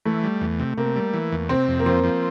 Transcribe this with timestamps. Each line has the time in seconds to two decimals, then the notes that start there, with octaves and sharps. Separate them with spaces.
0.05 E3 A3
0.24 G3
0.41 E2
0.59 C3
0.77 C3 A#3
0.96 G3
1.14 E3
1.32 E2
1.49 C3 C4
1.68 F2
1.79 A#3
1.86 F3 C4
2.04 F3